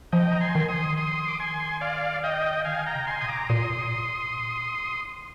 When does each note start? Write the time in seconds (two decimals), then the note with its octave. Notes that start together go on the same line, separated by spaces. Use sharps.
0.12 F3 D#5 G5
0.32 A#5
0.41 G#5 C6
0.55 D#3
0.68 C6 D#6
0.97 C6 D#6
1.28 D6
1.39 G#5 C6
1.81 D5 F5
2.23 D#5 G5
2.65 D3 F5 G#5
2.86 G5 A#5
2.94 C3
3.07 G#5 C6
3.21 A#2 D#6
3.29 A#5 D6
3.49 A#2 C6 D#6